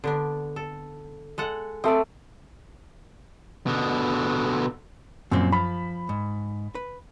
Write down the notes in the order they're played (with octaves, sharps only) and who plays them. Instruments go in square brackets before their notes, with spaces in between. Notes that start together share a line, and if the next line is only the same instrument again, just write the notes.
[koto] D3 B3 D4
A4
G#3 A4 F#5
[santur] A3 D#6 [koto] C4 D5
[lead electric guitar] B2 D3
[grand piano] F#2 [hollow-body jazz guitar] A#2 F3 C4
[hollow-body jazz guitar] F3 [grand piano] B5
[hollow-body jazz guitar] G#2
B4